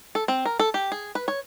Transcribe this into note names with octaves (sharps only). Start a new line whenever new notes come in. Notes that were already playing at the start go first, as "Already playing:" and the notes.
A4
C4
A#4
A4
G4
G#4
B4
C#5